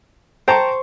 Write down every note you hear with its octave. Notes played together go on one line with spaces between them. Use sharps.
C5 G5 A5 A#5 C#6